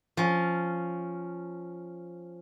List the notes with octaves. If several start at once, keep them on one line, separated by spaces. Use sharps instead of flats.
F3 C#4